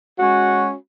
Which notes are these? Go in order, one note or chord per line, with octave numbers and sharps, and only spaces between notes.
G#3 C#4 F#4